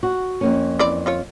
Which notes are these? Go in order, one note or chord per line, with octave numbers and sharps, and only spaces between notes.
F#4
F2 A#3 C#4
E3 C4 D5
C4 F4 C#5